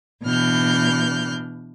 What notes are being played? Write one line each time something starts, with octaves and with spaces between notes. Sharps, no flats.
B2 E3 D4 F6 G6